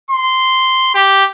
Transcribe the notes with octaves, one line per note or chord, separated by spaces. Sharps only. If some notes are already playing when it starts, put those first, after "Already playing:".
C6
G4